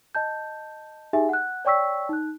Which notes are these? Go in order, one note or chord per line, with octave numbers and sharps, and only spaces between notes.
D#5 A5 G6
D#4 G4 G#4 E5 G#5
F#5 F#6
C#5 D5 G5 C#6 E6 B6
D#4 F#6